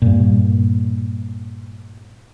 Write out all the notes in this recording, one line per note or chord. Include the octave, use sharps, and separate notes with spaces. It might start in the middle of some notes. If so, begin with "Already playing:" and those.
G2 A#2